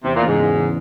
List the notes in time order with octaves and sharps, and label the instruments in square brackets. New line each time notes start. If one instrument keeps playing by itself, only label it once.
[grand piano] E2 [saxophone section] C3
[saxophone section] A#2
[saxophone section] G#2 [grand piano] C#3 E3
[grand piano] E2
C#3 E3